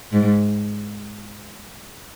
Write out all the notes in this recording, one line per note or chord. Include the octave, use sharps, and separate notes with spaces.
G#2